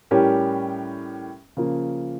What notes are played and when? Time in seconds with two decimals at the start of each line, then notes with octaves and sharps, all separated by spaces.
0.11 A2 G3 C#4 G4 A#4
1.57 C#3 F3 A#3